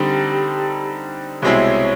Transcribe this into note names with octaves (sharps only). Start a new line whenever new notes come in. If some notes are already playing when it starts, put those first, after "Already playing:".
Already playing: D3 G3 C4 D#4 G4
C2 B2 G#3 C4 E4 C#5